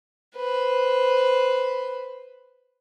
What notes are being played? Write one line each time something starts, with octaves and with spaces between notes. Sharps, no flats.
B4 C5